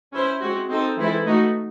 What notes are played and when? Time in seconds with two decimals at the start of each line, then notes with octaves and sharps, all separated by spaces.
0.12 C#4 E4 C5
0.41 G#3 C4 F#4
0.69 C4 D#4 A4 C5
0.97 E3 G#3 C4 E4 A4
1.26 A3 D#4 F#4